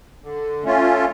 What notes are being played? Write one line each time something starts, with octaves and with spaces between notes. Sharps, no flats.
D3
A3 C#4 F4